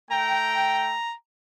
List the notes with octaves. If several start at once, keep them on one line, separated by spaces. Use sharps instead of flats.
A3 G5 A#5